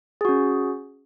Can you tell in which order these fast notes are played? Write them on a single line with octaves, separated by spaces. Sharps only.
G#4 F#4 C#4